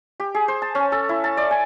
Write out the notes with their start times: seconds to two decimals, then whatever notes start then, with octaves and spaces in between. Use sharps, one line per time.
0.20 G4
0.35 G#4
0.48 C5
0.62 A5
0.75 C#4
0.92 A4
1.09 E4
1.24 A5
1.37 D5
1.51 G#5